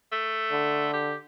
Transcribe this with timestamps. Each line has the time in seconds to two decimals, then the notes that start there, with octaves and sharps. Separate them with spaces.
0.12 A3
0.51 D3
0.93 G4